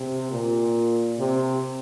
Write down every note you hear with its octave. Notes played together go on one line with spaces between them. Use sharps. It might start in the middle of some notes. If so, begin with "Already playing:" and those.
Already playing: C3
A#2
C3